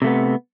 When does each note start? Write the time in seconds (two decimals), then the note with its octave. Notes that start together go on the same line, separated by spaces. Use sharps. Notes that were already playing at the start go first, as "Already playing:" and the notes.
0.02 C3
0.04 A3
0.07 B3